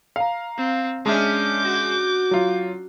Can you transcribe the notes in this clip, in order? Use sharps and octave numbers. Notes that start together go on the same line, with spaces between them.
F5 A#5
C4
G#3 C#4 D4 G#4 E5 D6 G6
F#4
F#3 F4